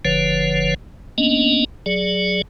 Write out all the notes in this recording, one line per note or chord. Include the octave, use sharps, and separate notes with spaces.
F#1 D3 F3 B4 C#5
A#3 B3 C#4 D4 D#5
F#3 G#4 D5